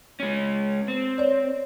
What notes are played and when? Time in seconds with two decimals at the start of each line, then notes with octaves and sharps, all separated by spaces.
0.20 G#3 C#4
0.88 C4
1.18 C#5 D5